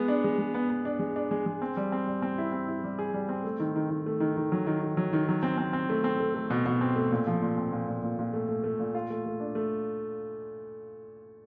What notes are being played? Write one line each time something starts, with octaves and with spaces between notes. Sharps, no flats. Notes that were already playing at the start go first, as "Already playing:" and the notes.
Already playing: G#3 B3
D4
G#3
G#3
B3
B3
D4
G#3
D4
G#3
G#3
C4
G3
C4
G3
C4
E4
C4
E4
G3
G#4
G3
C4
A3
D#3
D#3
D#3
A3
D#3
D#3
F#3
D#3
D#3
F#3
D#3
F#3
C4
C4
C4
A3
C4
A3
A3
B2
B2
C4
A3
A#2
F3
A#2
C4
A#2
A#2
A#2
A#2
A3
A3
A3
A#2
F4
A3
A3
D4
A3